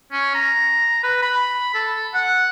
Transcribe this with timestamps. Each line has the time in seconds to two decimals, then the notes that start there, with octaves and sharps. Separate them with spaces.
0.12 C#4
0.35 A#5
1.03 B4
1.22 B5
1.74 A4
2.14 F#5